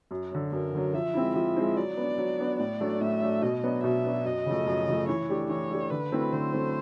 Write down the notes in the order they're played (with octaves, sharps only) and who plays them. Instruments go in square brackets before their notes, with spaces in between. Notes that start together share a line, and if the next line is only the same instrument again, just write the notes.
[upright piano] F#2
D3 F#3
[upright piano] F#2 [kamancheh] A#4
[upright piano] D3 F#3
[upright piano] F3 [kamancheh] E5
[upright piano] G#3 C4 E4
[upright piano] F3 [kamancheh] E5
[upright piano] G#3 C4 E4
[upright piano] F#3 [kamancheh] D5
[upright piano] B3 D4
F#3
B3 D4
[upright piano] A2 [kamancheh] D5
[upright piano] F#3 A3 D4
[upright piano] A2 [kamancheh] E5
[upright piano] F#3 A3 D4
[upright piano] B2 [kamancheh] D#5
[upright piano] F#3 B3 D4
[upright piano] B2 [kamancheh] E5
[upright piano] F#3 B3 D4
[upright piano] F#2 [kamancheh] D#5
[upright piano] C#3 F3 A3
F#2
C#3 F3 A3
[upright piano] E3 [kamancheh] C#5
[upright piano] A3 D4 G4
[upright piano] E3 [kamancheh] C#5
[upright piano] A3 D4 G4
[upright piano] D3 [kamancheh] B4
[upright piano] F#3 A3 C4 E4
[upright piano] D3 [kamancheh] C5
[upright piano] F#3 A3 C4 E4